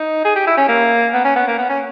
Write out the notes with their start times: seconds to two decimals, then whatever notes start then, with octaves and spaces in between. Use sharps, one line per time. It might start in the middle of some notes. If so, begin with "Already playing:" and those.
Already playing: D#4
0.25 G#4
0.36 G4
0.47 E4
0.57 C#4
0.68 A#3
1.13 B3
1.25 C#4
1.36 B3
1.47 A#3
1.58 B3
1.69 C#4